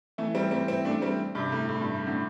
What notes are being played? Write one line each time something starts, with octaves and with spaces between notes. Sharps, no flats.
E3 A3
G3 C4
G3 C4
C4 E4
A3 D4
G3 C4
G2 C3
A2
A2
G2
A2
A2 D3